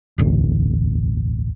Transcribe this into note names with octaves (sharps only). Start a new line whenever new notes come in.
E1 A1 D2